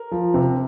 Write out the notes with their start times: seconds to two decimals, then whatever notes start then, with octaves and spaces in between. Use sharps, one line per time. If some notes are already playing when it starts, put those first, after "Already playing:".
Already playing: A#4
0.11 F3
0.34 C3